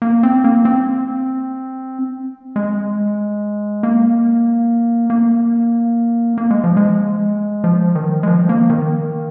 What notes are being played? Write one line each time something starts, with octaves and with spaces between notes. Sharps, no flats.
A#3
C4
A#3
C4
G#3
A#3
A#3
A#3
G#3
F3
G#3
F3
D#3
G#3
F3
A#3
D#3